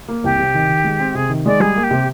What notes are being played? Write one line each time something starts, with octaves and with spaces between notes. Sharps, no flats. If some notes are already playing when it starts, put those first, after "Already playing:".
A#3
C2 G4
C3
D#3
D#3
G#3
C4
C3 G#4
D#3
G#3 D5
G3 G#4
A#3
G4
C3